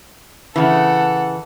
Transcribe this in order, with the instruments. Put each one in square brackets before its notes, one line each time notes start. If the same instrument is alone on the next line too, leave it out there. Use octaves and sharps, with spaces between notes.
[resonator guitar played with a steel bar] C#3 E3 [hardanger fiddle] A4 F#5